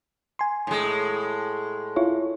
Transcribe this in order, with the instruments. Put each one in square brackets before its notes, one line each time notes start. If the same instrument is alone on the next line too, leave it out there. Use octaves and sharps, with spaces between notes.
[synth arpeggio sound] G#5 C6
[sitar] A2 G#3
[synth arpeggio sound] E4 F4 C#5